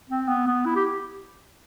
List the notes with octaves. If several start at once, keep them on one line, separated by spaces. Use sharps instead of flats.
C4
B3
B3
E4
G4